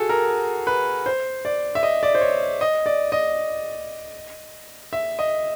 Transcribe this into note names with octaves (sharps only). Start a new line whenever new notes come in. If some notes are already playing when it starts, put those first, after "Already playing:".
Already playing: F#4 G#4 A4
A#4
B4
C5
D5
E5
D#5
D5
C5
C#5
D#5
D5
D#5
E5
D#5